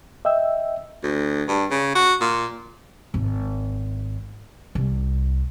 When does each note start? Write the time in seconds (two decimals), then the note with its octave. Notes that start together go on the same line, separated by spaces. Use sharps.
0.25 D#5 E5 G5 E6
1.03 D2
1.48 G2
1.71 C#3
1.95 F#4
2.21 A#2
3.14 G#1
4.75 C2